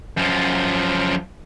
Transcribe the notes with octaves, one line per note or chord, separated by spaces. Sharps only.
F#2 F3